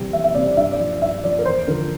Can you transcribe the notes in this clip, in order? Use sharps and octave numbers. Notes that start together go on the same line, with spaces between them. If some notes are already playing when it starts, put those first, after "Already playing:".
Already playing: E2 C3 G3
E2 E5
E5
C3 G3 D5
D5
G2 E5
D5
F3
G2 E5
F3 D5
A#4
E2 C5
D3 F3 A#4